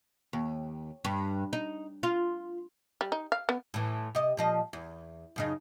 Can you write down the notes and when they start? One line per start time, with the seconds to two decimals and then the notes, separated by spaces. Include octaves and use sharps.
0.33 D#2
1.05 G2
1.53 D#4
2.03 F4
3.01 G3
3.12 D#4
3.32 F5
3.49 B3
3.74 A2 E3
4.15 C3 D#5
4.37 A#2 F3 D#5
4.73 E2
5.36 F#2 C#3 D#4